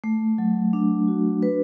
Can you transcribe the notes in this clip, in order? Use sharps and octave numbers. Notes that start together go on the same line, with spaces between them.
A3
F#3
D4
F#4
B4